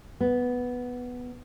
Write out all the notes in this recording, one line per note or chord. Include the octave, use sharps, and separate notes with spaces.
B3